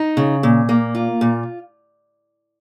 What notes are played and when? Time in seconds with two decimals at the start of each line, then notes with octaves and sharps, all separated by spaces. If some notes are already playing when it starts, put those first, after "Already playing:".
Already playing: D#4
0.17 C#3
0.43 A#2
0.69 A#3
0.95 F4
1.21 A#2